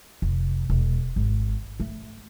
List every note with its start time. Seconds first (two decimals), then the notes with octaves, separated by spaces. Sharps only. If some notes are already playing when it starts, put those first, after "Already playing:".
0.22 F1
0.70 E1
1.16 G#1
1.80 A3